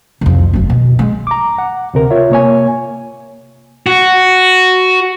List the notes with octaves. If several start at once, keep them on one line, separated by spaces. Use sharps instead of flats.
C2 F2
F#1 D2
B2
G#3
A#5 D6
F#5
D2 C3 A#4
F4 C#5 E5
C3 A#3 C#5 G#5
F#4